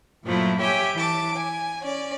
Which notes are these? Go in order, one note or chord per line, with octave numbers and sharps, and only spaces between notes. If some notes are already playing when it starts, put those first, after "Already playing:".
G2 A#2 F3 F#3 A3 E4
G4 C#5 E5 G5 G#5
E3 A5 D6
G#5
C#4 D5